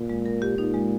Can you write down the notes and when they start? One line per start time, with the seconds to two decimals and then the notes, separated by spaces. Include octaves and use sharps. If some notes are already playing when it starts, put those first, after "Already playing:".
Already playing: A#2
0.10 G#3
0.26 A#4
0.42 G4
0.58 A#2 D#4
0.74 G#3